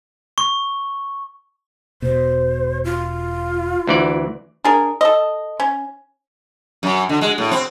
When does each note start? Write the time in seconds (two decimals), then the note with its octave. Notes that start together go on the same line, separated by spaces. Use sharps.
0.38 C#6
2.02 E1 B2 C5
2.84 F4
3.87 D2 E3 D5
4.64 D4 G#4 A#4
5.01 A4 D#5
5.60 C#4
6.83 F#2
7.09 D3
7.21 G#3
7.38 A2
7.51 C4